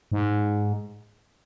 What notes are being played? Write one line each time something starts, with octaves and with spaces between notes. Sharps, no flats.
G#2